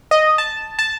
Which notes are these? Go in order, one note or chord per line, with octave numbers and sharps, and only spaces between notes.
D#5
A5
A5